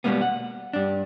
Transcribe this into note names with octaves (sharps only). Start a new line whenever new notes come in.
B2 E3 G3 G#3 A#3 B3
F#5
G2 D4